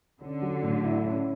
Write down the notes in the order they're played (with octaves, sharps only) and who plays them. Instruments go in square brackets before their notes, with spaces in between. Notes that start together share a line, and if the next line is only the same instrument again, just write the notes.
[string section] D3 [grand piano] C#4
[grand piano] F#3
A2
E4
C#4